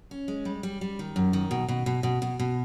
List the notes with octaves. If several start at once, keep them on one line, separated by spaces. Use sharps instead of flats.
C#4
G#3
G3
G3
G3
D#3
F#2
D#3
B2
B2
B2
B2
B2
B2